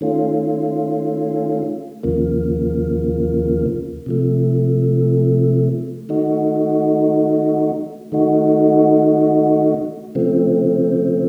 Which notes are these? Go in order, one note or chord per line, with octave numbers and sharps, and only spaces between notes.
D#3 A3 C#4 F4
D#2 C#3 F3 A#3
C3 F3 A3
D#3 A3 D#4 F#4
D#3 A3 D#4 F#4
C#3 F3 A3 C4